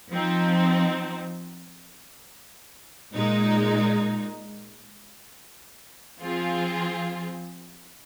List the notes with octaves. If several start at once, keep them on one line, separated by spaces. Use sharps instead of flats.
F3 C4 D#4
A#2 G#3 D#4
F3 C4 F4 G#4